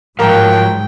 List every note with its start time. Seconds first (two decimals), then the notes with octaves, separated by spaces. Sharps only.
0.19 G#2 F3 F#3 A#4 F5 G5